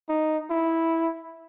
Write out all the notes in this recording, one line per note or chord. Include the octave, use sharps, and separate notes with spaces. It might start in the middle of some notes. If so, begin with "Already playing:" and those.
D#4
E4